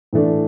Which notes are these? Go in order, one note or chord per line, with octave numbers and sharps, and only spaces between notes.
A2 E3 A3 D4